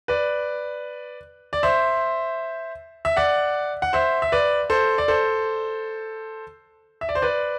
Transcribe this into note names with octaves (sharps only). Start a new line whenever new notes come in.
B4 D5
D5
C5 E5
E5
D5 F#5
F#5
C5 E5
E5
B4 D5
A4 C5
D5
A4 C5
E5
D5
C5
B4 D5